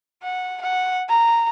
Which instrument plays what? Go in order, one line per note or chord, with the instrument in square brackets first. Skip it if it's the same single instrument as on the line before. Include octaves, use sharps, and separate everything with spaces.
[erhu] F#5
F#5
A#5